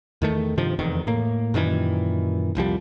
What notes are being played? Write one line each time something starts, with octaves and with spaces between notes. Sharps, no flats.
E2 D#3 A3
G2 C3 D#3 F3
F1 E2 D#3
A2 A#3
F#2 A#2 D#3 E3
F1 C2 F3 G3